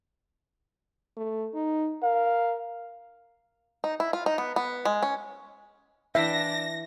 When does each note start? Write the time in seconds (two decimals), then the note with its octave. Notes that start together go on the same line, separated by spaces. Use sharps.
1.17 A3
1.54 D#4
2.03 A#4 F5
3.84 D#4
4.00 E4
4.13 F4
4.26 D#4
4.38 B3
4.56 B3
4.85 G#3
5.03 C#4
6.15 E3 D4 E5 F5 G5 A#6